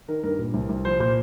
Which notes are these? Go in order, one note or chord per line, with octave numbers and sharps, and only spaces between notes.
D#3 A#4
G2 A#4
A#2
C2
C2
F3 C5
A#2 C5